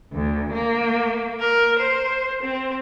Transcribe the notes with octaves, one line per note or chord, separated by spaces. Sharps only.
D2
A#3
A#4
C5
C4